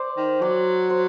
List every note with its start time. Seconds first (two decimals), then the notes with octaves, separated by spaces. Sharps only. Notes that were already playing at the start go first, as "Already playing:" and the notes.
Already playing: C5 D5
0.17 D#3
0.41 F#3 D5
0.90 C5